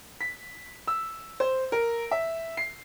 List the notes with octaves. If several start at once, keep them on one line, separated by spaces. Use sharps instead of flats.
B6
E6
C5
A#4
E5
C7